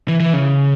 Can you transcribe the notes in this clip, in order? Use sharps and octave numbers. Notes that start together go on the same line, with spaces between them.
E3
E3
C#3